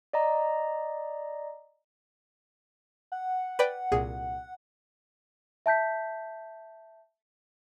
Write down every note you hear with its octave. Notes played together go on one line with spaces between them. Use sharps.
D5 D#5 A#5
F#5
B4 D5 G5
C2 A#2 G#4
E5 A5 G6 B6